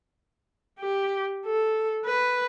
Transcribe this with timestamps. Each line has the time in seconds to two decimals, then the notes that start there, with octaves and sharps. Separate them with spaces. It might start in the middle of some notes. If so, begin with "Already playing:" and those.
0.80 G4
1.46 A4
2.06 B4